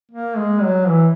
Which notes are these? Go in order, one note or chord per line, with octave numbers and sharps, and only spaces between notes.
A#3
G#3
F#3
E3